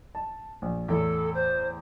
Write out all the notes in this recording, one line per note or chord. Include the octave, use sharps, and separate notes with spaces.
A5
A#1
E2 A2 A4
C5